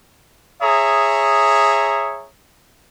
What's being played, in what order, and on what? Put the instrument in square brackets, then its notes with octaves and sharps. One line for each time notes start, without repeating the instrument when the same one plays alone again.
[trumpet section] G#4 C#5 E5 A#5 D#6